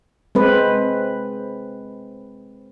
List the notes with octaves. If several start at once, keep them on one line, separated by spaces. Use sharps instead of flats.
G#3 C4 B4